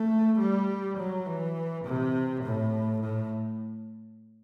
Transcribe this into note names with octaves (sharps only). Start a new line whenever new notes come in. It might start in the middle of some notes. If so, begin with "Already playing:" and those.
Already playing: A3
G3
F#3
E3
C3
A2
A2